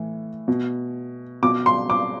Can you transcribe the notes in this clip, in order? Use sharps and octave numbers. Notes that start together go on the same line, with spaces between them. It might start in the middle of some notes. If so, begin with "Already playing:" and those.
Already playing: A2 E3
B2
B2 D6
C6
D6